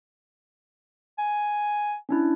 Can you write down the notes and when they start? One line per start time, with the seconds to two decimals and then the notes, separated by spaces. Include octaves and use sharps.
1.19 G#5
2.09 C#4 D4 E4